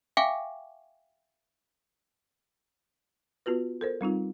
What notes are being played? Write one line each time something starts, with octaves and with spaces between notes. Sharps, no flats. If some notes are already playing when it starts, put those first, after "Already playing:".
E5 F5 G5 G#5 C#6 D6
B3 F4 F#4 B4
A4 A#4 C5
G3 C4 D#4 F4